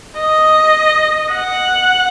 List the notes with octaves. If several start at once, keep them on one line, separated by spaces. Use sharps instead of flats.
D#5
F#5